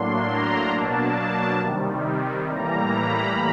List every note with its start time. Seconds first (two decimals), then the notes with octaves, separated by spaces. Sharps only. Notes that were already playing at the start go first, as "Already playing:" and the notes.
Already playing: A2 F#3 A#3 D4 C6
0.27 A#5
0.71 B2 F#3 A#3 D4 A5
1.60 C3 D#3 G3
2.49 A2 E3 G3 A#3 A#5
2.94 B5